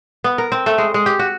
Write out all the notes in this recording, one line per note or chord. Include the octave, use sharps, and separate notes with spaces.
B3
A#4
C4
A3
G#3
G#3
G4
F#4